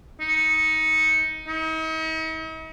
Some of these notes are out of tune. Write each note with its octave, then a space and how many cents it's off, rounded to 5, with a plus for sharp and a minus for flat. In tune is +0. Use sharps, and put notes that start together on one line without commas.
D#4 +20
D#4 +45